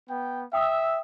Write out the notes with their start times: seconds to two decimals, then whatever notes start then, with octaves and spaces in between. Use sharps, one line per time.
0.10 B3 G5
0.53 E5 G5 D#6 E6